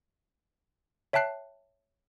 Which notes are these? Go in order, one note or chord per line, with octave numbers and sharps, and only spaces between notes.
C#5 E5 G5 A5 F#6 C7